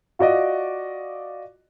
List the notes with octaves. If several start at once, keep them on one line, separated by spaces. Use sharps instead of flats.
F4 F#4 D5 D#5